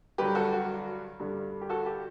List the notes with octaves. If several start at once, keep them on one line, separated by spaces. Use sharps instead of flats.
G2 D3 F#3 G4 B4
F#4 A4
F#4
G2 D3 G3
G4
F#4 A4
G4